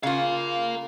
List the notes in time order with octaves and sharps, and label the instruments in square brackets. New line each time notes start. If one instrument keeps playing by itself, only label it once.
[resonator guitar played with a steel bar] C#3 F4 [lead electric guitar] A#4 F5